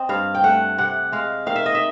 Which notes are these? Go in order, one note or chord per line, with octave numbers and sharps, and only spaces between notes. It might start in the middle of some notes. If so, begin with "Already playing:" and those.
Already playing: C4 D#5
G2 F5
G5
A3 F#5
C3 F#5
G#3 F5
D#3 F5
E5
D#5
E5